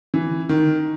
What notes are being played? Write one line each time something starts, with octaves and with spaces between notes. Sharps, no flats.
E3
D#3